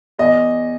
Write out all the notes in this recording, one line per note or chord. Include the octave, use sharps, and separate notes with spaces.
E2 D#5